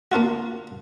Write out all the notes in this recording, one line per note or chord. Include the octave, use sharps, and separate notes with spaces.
A#3 D4 F4 F#4